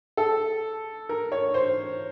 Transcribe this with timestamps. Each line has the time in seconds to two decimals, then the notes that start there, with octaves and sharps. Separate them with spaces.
0.17 A4
1.09 A#4
1.32 C#5
1.54 C5